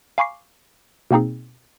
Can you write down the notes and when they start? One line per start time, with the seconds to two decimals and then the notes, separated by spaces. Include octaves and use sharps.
0.18 F5 G#5 B5 C#6 D6 C7
1.11 B2 A#3 C4 D#4 G#4